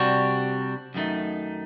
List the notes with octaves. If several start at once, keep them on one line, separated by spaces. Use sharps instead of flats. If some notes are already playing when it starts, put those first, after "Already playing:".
Already playing: C3 G3 D4 F#4
F#2 D#3 A3 D#4